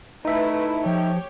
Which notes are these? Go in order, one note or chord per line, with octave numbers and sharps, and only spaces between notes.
A3 D#4 E4 B4 E5
F3 G4 C#5